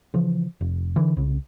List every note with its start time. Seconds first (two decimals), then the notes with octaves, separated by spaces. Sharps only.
0.14 C#3 E3 F3
0.61 F1
0.96 D3 E3
1.17 C2 C#3